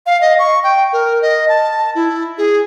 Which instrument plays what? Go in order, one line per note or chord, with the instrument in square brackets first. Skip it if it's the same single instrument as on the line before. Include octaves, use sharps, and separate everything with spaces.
[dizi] F5
D#5
C#6
G5
A#4
D#5
A5
E4
G#4